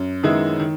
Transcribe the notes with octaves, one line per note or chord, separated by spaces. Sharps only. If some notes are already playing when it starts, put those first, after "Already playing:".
Already playing: F#2
D#3 G#3 B3 E4
D#3